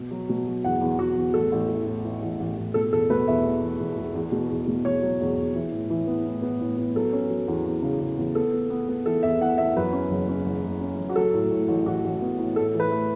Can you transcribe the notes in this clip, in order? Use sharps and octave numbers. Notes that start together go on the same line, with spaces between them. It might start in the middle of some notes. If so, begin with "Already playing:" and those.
Already playing: B2
F#3
B2
F#3
E2 F#5
E2
E2 F#4
E2
A1 A4
A1
E3
A2
E3
A1
A1
A1
B2 A4
E1 A4
B2 B4
E2 E5
E1
E1
E1
E1
E2
B2
E2
B2
E1 C#5
F#3
E1
E1
E3
A2
E3
B3
A2
B3
A2
B3
F#3 A4
C#4
F#3
E2
E2
C#3
C#3
E2
B3 A4
B3
B3
B3
E3 A4
E2 E5
E2 F#5
E2 E5
F#2 B4
C#4
F#1
C#4
F#1
F#1
C#4
F#1
F#4
F#3 A4
A2
A2
A1
A1 F#4
A1
B3
A2
A2 A4
E3
B4
A3